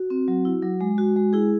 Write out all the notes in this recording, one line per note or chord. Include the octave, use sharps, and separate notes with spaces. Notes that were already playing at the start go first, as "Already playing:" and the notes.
Already playing: F#4
C4
F#3
E4
F#3
G#3
F#4
G#3
E4 G#4